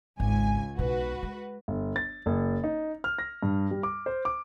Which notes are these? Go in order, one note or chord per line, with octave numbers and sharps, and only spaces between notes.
G#1 C#2 G#5
B1 B2 F#4 B4
G#3
G1
A6
F#1
D#4
F6
A#6
G2
G3
D6
C5
D6